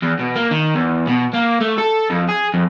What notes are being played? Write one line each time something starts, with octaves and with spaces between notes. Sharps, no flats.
E2
B2
A#3
D#3
E2
B2
A#3
A3
A4
F2
G#4
F2